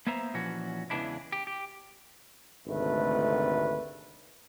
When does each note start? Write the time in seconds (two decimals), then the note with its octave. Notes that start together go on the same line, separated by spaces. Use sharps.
0.07 A#3 B3 C5 E5 A#5
0.34 A#2 E3 F3 C#4 F#4
0.90 E2 C#3 E3 G#3 D4 E4
1.32 G4
1.47 G4
2.67 G#1 D2 C3 A3 B4